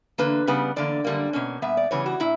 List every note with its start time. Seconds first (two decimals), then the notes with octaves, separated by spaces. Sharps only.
0.18 E2 D3 A#3 B4
0.47 C#3 G3 B3
0.76 E2 D3 A#3 D5
1.05 F#2 D3 G3 A#3
1.33 B2 A#3 C#4
1.62 A#2 G3 B3 E5
1.77 D5
1.91 C#3 E3 G3 B3 C#5
2.06 F#4
2.20 A#2 E4